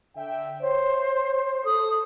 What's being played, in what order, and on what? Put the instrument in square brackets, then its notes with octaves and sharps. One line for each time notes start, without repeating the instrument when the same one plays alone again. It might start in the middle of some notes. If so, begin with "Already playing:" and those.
[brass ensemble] D3 E5 G5
[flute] C5 [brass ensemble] C#5
[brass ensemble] A4 [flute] D#6